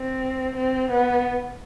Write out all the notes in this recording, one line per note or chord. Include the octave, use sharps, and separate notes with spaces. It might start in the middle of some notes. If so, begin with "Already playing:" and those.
Already playing: C4
C4
B3